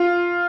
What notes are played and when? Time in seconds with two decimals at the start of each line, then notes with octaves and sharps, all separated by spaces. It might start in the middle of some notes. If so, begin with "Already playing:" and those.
Already playing: F4